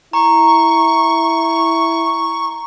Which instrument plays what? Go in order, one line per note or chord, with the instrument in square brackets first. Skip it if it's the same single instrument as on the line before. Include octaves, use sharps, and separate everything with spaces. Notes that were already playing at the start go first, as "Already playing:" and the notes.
[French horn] E4 [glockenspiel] A#5 [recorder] C#6